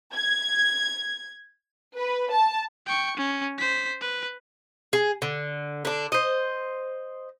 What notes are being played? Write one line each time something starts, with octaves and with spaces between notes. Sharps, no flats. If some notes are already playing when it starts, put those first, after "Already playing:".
G#6
B4
A5
G5 C#6
C#4
C5 B6
B4
G#4
D3
D3 D4
C5 D#5